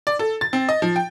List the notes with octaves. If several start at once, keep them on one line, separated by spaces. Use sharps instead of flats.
D5
A4
A6
C4
D#5
F3
G5